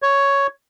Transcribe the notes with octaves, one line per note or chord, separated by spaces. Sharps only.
C#5